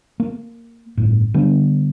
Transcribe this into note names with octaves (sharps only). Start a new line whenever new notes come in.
A#3
G1 A2
D3 G3 B3